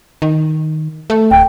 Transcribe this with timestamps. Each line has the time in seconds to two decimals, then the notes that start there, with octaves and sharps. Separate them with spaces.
0.22 D#3
1.10 A3
1.31 D1 G5